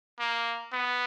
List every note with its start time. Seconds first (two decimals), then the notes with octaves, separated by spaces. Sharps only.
0.19 A#3
0.74 B3